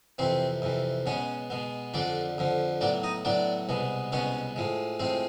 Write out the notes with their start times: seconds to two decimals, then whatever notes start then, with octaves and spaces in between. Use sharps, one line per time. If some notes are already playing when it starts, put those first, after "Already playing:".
0.18 F2 C3 E3 C4 C5
0.62 F2 C3 E3
1.06 B2 G#3 B3 C#4 C#5
1.50 B2 G#3 B3
1.94 F2 D3 F3 D4 D5
2.38 F2 D3 F3
2.81 A2 F#3 B3 D4 D5
3.03 D#4 D#5
3.25 A2 F#3 B3 D4 D5
3.69 C2 B2 G#3 B3
4.12 C2 B2 G#3 B3 C#4 C#5
4.56 A2 F3 G#3
4.99 A2 F3 G#3 C4 C5